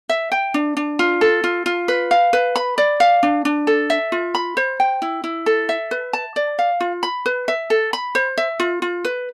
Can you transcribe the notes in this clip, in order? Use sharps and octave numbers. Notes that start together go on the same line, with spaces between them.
E5
G5
D4
D4
F4
A4
F4
F4
B4
F5
B4
B5
D5
F5
D4
D4
A4
E5
F4
B5
C5
G5
E4
E4
A4
E5
B4
A5
D5
F5
F4
B5
B4
E5
A4
B5
C5
E5
F4
F4
B4